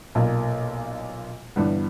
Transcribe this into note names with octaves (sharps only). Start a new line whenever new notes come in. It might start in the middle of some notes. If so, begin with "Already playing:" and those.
B1 A#2 A#3
G1 G2 E3 G3 B3